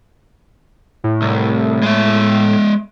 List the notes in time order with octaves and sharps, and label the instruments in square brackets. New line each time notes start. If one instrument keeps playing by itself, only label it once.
[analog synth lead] A2
[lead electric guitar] C2
G#3 E5